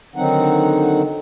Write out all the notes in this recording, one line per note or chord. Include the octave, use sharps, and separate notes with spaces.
D3 D#3 F#3 C4 D#4 F#5